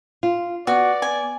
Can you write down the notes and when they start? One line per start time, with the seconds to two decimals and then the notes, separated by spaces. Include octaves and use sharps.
0.23 F4
0.67 B3 F#4 D5
1.02 G#5